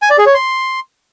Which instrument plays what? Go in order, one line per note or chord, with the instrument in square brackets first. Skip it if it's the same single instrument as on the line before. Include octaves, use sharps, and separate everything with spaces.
[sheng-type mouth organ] G#5
D5
G#4
C#5
C6